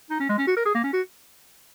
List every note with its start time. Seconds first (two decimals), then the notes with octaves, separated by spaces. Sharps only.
0.10 D#4
0.20 C#4
0.29 G#3
0.38 C#4
0.47 F#4
0.56 A#4
0.65 G#4
0.75 A#3
0.84 C#4
0.93 F#4